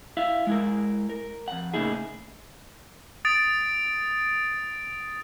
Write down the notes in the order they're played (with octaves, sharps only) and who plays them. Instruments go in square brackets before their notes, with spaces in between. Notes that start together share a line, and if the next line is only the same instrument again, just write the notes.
[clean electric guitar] E4 E5 F5
G#3 E4 A#4
A#4
F2 F#5
A2 C#3 A#3 D#4 E4 G#4
[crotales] D#6 A6 D7